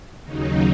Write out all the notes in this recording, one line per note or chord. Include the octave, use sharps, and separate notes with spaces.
D#2 C#3 F#3 D#4